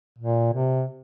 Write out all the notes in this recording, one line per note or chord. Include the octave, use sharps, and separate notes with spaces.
A#2
C3